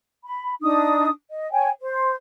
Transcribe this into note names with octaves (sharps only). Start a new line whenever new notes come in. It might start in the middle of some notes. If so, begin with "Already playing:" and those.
B5
D4 D#4 D#6
D#5
C#5 G5 G#5
C5